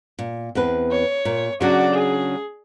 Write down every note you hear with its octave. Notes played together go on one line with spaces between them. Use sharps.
A#2
E2 C4 B4
C#5
A#2
C#3 F#3 D4 F#4 D5
G#4